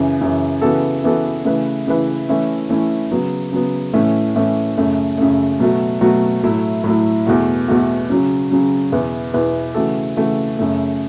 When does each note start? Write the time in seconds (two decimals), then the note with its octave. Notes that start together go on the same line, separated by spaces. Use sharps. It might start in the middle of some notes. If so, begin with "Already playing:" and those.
Already playing: F#2 C#3 E3
0.21 F#2 C#3 E3
0.61 C#3 E3 B3 F#4 A4
1.04 C#3 E3 B3 F#4 A4
1.45 C#3 E3 A3 E4 B4
1.87 C#3 E3 A3 E4 B4
2.29 E3 A3 C#4 E4
2.69 E3 A3 C#4 E4
3.11 C#3 F#3 B3
3.52 C#3 F#3 B3
3.93 A2 E3 A3 C#4
4.35 A2 E3 A3 C#4
4.78 F#2 C#3 A3
5.18 F#2 C#3 A3
5.60 B2 F#3 A3 F#4
6.01 B2 F#3 A3 F#4
6.43 A2 F#3 A3 E4
6.84 A2 F#3 A3 E4
7.27 E2 B2 A3 F#4
7.68 E2 B2 A3 F#4
8.10 C#3 F#3 C#4
8.50 C#3 F#3 C#4
8.92 E2 B2 B3 E4 B4
9.33 E2 B2 B3 E4 B4
9.74 C#3 E3 A3 F#4 A4
10.16 C#3 E3 A3 F#4 A4
10.59 F#2 C#3 A3